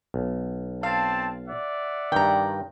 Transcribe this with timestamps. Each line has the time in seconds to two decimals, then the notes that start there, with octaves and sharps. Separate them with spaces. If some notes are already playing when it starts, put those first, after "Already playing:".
0.14 B1
0.83 C4 F5 A5
1.48 D5 E5 F#5
2.12 G2 D#3 G5 A#5